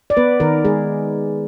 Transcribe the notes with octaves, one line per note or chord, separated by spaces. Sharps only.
D5
B3 B4
D#3 A#4
G#3 G#4